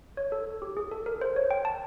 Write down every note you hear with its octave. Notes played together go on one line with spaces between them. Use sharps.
C#5
A4
G4
G#4
A4
A#4
C5
C#5
G5
A5